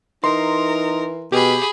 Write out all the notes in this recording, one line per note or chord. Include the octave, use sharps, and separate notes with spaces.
E3 D#4 A#4 C6
B2 G4 G#4 B5